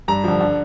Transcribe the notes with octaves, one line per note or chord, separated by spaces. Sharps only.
G2 A#5
D3 F3
D3